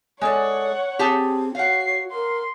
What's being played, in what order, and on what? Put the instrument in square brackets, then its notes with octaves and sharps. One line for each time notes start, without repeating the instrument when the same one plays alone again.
[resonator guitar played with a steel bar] G#3 A4 D5 [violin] C#5 F#5
[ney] C4 [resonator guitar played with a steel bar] G4 G#4 A5
[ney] F#4 [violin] C#5 C7 [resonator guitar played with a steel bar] F5 F#5
[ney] A#4 [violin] C6